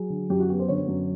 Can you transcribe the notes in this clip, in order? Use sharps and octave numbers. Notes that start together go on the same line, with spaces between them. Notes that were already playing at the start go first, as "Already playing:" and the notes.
Already playing: F#3 G#4
D3
F#2 G4
F#4
B3 G4
C5
D3 C#5
F#2